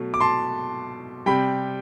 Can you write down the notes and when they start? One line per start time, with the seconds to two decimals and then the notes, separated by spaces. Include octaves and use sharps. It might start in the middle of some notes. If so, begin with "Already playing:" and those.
Already playing: B2 F#3 A3
0.14 D6
0.20 A5 C6
1.26 C3 G3 G5 B5